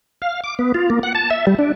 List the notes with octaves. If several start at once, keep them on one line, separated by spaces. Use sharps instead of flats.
F5
D6
B3
F4
A#3
F#5
A5
E5
G3
D4